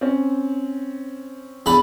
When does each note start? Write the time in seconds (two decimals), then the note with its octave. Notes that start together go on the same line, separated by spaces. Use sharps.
0.01 C4 C#4
1.66 E2 D3 B5